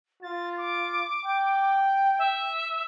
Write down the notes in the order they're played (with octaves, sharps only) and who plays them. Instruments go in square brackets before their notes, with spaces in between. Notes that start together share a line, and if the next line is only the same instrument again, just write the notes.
[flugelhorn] F4 [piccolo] A6
[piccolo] D6
[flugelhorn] G5
[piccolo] E5